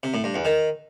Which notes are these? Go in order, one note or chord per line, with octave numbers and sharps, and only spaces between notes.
C3
A2
G2
E2
D#3